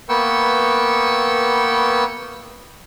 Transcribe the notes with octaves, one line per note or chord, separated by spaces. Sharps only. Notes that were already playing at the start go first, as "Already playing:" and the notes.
A#3 B3 B4 G5 C#6 E6